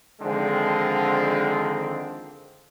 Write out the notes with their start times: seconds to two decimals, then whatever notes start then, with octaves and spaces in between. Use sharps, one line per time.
0.21 D3 D#3 F3 G#3 C4 D4